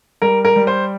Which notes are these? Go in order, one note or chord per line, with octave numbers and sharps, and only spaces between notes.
G3 A#4
A#4
G3
C5